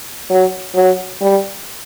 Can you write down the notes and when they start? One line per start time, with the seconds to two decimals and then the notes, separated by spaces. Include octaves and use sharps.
0.29 F#3
0.75 F#3
1.22 G3